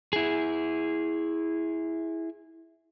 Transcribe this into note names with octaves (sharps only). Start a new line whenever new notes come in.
E4 G#4